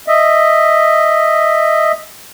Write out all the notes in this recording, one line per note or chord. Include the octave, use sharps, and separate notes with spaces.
D#5 E5